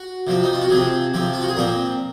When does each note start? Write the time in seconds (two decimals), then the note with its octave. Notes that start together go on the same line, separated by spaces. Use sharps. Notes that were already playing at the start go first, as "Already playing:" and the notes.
Already playing: F#4
0.27 C3 F3 C4
0.44 D#4
0.53 F4
0.61 F#4
0.70 C3 F3 C4 G#4
1.14 C3 F3 C4
1.33 F4
1.41 F#4
1.48 G#4
1.57 A#2 F3 C4 A#4